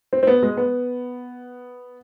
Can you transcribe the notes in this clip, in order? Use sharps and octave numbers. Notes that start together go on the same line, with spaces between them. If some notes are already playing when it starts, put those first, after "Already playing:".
C4
C4
B3
G#3
B3